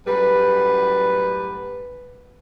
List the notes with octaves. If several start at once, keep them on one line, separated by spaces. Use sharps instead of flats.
F#2 A2 G3 B4